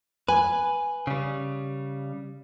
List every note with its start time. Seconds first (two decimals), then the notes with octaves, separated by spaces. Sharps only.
0.28 B4 G#5
1.07 C#3 G3